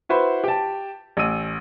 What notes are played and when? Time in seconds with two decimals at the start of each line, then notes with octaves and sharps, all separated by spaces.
0.09 E4 F#4 B4 C5
0.44 G4 A5
1.17 A1 E6 D#7